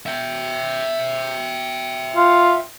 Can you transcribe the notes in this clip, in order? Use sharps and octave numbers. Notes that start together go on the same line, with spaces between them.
E5 G5
F4